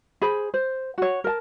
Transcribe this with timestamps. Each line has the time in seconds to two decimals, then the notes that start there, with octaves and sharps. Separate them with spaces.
0.22 G#4 C5 B5
0.54 C5
0.98 F#4 C#5
1.24 A#4 A5